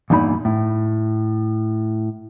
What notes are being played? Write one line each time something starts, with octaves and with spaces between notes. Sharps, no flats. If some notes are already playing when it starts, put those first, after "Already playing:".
E2 G2 A#2 D#4 B5
A2